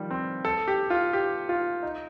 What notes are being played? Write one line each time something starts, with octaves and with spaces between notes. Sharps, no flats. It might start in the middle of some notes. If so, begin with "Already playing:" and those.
Already playing: D#3 F3 G3
C4
A4
G4
F4
G4
F4
D#4